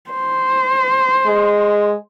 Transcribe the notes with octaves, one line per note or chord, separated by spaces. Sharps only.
C5
G#3